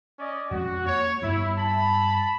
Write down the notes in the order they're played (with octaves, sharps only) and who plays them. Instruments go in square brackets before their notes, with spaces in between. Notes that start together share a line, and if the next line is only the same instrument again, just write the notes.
[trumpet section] C#4 D5 D#5
[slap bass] F2 G#3 C#4 [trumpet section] F#4
[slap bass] A#3 [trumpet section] C#5
[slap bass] G2 G3 B3 [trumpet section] E4
[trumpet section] A5 B5